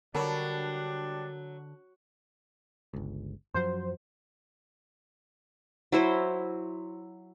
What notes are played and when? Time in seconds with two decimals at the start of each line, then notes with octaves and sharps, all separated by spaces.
0.15 D3 F#3 G3 D4 A#4 A5 B5
2.93 G1 C#2
3.54 F#2 F3 F#3 C5
5.92 F#3 E4 C5